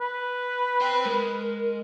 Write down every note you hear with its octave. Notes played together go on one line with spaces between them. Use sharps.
B4
C5 G5
G#3 A#4